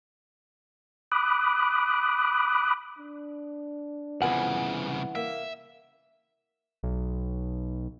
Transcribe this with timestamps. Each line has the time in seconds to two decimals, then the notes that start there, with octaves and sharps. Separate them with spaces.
1.12 B5 D6 D#6 F#6
2.98 D4
4.22 C2 F2 C#3 E3 B3 F#5 G#5
5.15 A#3 E5
6.83 B1